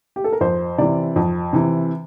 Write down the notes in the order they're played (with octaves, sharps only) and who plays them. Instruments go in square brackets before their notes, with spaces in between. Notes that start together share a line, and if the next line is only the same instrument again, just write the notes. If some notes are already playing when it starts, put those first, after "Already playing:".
[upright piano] G4
A4
A#4
F2 C5
C3 E3 D5
F2
C3 E3